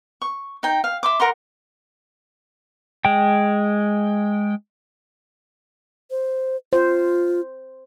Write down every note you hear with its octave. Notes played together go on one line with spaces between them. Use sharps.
C#6
D#4 G5
F5
E5 C6 D6
A#4 F#5 A#5 C6
G#3 G5
C5
F4 C5